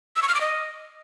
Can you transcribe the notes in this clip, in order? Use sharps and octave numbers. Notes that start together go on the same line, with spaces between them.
E6
C#6
F6
D6
D#5